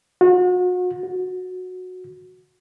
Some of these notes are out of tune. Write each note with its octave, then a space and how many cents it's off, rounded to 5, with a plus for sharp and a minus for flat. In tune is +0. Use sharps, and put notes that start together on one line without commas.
F#4 -40
F#4 -15